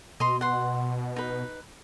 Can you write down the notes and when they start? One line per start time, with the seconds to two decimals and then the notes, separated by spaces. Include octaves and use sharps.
0.20 B2 D#5 A#5 C6
0.41 F#5 C6
1.16 D#4 B4